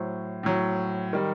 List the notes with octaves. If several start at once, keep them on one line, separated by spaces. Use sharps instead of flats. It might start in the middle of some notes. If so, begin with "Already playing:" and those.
Already playing: A2 F#3 C5
A2 F#3
D#3 G3